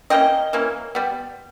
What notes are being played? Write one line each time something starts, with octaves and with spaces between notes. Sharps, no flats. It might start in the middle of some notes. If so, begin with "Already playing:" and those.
E3 A#3 C#4 D#5 G5
E3 A#3 C#4
G3 B3